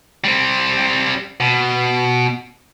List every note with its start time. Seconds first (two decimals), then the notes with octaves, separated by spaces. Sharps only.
0.24 G3 C4
1.40 B2